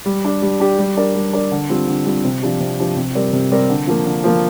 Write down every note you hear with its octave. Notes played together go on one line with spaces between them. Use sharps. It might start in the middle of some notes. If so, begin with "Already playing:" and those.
G3
D4 G4
G3
D4 G4
G3
D4 A#4 D5
G3
D4 A#4 D5
D3
G3 C4 F4
D3
G3 C4 F4
C3
F3 D4 G4
C3
F3 D4 G4
C3
G3 C4 A#4 D5
C3
G3 C4 A#4 D5
D3
F3 A#3
D3
F3 A#3